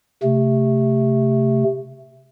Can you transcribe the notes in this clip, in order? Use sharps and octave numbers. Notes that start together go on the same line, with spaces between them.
C3 A3